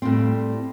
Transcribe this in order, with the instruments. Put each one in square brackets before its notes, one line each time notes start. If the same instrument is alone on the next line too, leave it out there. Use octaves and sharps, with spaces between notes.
[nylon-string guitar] A2 G3 C4